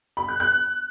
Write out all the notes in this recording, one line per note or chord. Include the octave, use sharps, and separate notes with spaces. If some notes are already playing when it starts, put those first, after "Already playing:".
B5
F#6
F#6